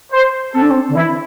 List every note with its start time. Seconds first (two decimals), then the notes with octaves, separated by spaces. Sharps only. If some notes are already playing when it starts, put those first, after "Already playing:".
0.12 C5
0.54 C4 A4
0.62 D4
0.71 C4
0.89 D3
0.96 E3 E4